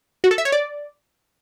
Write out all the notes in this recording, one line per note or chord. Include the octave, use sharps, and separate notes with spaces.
F#4
A4
E5
C#5
D5